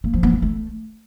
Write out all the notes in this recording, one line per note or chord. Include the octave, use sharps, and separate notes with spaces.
A#3
F3
B3
G#3
A3